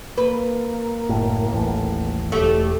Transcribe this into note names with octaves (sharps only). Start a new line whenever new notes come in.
A#3 B4
F#1 A2
D#1 A1 A2
E1 A3 G4